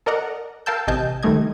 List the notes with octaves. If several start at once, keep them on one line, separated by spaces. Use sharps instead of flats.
A4 A#4 D5 D#5 F#5 A#5
A#4 F5 G5 A5 E6 G6
A1 C3 D#5 G#5 A5 G6
C#2 D#3 G3 A3 D#5 G#6